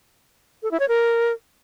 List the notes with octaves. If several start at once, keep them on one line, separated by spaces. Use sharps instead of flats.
A4
E4
C#5
A#4